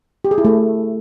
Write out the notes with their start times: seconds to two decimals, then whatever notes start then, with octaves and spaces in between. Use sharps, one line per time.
0.25 G4
0.31 G#4
0.38 E4
0.45 A3